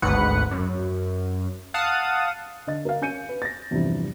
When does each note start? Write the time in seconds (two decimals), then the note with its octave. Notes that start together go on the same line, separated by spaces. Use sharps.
0.02 G#1 D2 G#2 B4 F#5 C#7
0.51 F#2
1.74 F5 F#5 A5 D#6
2.67 D3 D#5 A6
2.85 A#4 F5
3.01 C#4 G#5 G6 C#7 D#7
3.29 B4
3.42 A6 A#6
3.71 E2 G2 C3 E3 F3 G3